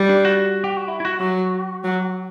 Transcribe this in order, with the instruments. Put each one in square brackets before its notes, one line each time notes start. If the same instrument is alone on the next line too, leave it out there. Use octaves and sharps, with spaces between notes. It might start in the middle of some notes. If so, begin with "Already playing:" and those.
Already playing: [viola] G3
[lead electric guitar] D4
F#4
G4
F#4
E4
E4
F#4
[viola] F#3 [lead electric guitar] F#4
[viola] F#3